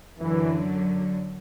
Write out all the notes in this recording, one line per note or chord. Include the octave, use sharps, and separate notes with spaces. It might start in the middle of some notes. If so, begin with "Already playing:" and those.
F#2 D3 E3 F#3